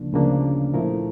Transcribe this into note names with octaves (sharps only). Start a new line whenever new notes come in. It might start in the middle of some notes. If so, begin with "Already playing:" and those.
Already playing: D2 C#3 F3 A#3 D4
D2 C#3 F3 A#3 D4
A#2 F3 A3 E4 A#4